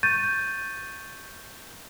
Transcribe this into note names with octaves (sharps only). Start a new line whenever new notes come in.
C#6 G6 A6 D#7